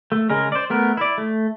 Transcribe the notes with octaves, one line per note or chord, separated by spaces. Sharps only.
A3
C#3 G#3 A#4
C5 D5
A3 B3 A#4
E4 D5
A3